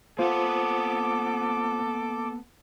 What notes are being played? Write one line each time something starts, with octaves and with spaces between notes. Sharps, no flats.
A#3 B3 F4 A4 C5 F#5 D6